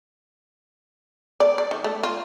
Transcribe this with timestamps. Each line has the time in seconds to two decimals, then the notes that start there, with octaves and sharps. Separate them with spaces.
1.40 D5
1.58 D5
1.71 D#3
1.84 A3
2.03 F4